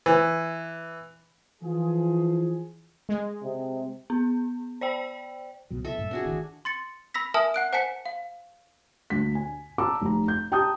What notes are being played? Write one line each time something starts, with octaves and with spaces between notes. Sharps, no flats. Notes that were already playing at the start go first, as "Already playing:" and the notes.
E3
E3 F3 F4 G#4
G#3
C3
B3
C5 D5 G5
C2 B2 F#3
B2 A4 E5
G2 A#2
C4 D4 F#4 G#4
A1 D#3 E3
C6 A6 C#7
B5 E6 A#6 B6
A#4 E5 G#5 A5 D#6 F6
F#5 F#6 D7
C5 F#5 G#5 A5 B6 C#7
F5
D2 B6
G#5
A5 A#5 D6 E6
F1 A#5
G6
G4 G5 A5 A#5 D#6 G6